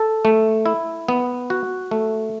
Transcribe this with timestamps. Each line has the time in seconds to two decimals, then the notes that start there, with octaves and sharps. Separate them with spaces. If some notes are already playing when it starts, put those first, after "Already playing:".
Already playing: A4
0.25 A3
0.66 E4
1.08 B3
1.50 F#4
1.91 A3